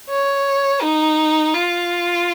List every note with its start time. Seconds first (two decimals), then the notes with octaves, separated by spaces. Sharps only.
0.10 C#5
0.82 D#4
1.54 F4